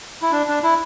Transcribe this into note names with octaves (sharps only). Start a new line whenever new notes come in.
E4
D4
D4
E4